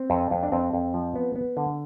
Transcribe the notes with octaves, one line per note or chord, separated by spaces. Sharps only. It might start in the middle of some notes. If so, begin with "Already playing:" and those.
Already playing: C4
F2
F2
D4
F2 C4
F2
F3
B3
B3
D3